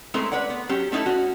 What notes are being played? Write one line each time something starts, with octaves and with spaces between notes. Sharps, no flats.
G#3 A3 C4 C#4 E4 A#4
B4 C#5 D5 F#5
B3
F#3 C#4 G4
A3 C#4 D#4 E4 A4
C#4 F#4